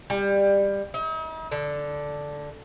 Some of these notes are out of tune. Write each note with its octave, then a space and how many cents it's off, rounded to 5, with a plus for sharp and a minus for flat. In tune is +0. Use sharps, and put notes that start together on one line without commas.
G3 +20
D#4 +45
D3 -5